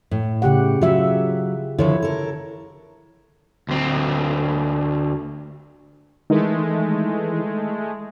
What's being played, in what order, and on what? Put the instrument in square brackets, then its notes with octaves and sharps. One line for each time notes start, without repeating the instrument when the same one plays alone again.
[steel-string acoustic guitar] A2
[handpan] C#3 G4 F#5
[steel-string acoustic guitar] F#3 [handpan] F4 E5
[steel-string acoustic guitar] D3 D#3 F3 [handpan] E4 C#5
[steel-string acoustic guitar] A4 A#4
[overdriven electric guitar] D2 C4
[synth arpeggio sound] D#3 E3 [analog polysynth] G#3 A3